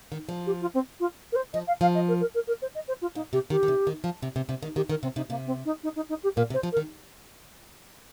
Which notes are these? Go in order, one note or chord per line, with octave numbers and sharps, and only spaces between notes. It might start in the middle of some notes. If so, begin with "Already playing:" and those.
D#3
F3
G4
F4
C4
F4
A#4
C5
F3 D#5
F5
F3 F5
D#5
A#4
A#4
A#4
A#4
C5
D#5
C5
F4
A#2 D#4
C3 G4
D#3 G4
D#3
C3
D#3
F3
C3
C3
C3
D#3
D#3 G4
D#3 A#4
C3 C4
C3 D#4
C3 A#3
C4
D#4
D#4
D#4
D#4
G4
A#2 A#4
C3
C5
F3
A#4
D#3